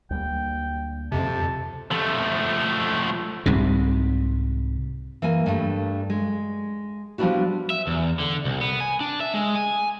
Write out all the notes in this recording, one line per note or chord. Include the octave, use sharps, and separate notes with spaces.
D2 G3 A#3 G5
F2 C3 A5
F3 A3
C2 G#2 C3
E3 A#3 G#5
G2 A3
G#3
F3 G3 B3 D4 E4 F#4
E5
E2
D3
C2
B3
G#5
D4
E5
G#3
G#5